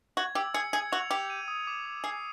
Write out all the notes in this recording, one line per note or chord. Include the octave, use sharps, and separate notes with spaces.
F#4 G#6
G4 E6
G#4 C#7
G#4 G#6
F#4 F7
G4 F7
D#7
D#6
D6
D6
G#4 C7